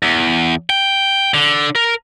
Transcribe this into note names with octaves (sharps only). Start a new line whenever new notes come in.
E2
G5
D3
A#4